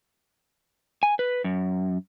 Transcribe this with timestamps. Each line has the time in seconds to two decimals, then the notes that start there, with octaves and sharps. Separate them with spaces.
1.03 G#5
1.19 B4
1.44 F#2